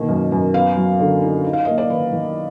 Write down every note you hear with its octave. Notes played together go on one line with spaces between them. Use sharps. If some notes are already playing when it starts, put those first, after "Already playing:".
Already playing: B2 D#3 A#3
F#2
F#2
B3 F5
F#3
D3
D#4
D#4
F5
A#3 D#5
D5
D#3 B4
D#3